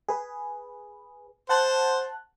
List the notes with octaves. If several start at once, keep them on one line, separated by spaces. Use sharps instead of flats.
G#4 B4
C5 F#5 A5 F#6